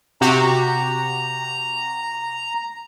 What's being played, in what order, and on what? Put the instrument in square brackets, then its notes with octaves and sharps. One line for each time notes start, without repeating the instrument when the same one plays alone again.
[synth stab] C3 F#4 G4 [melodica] A#5